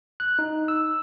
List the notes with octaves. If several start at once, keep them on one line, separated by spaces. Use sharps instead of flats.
F#6
D#4
E6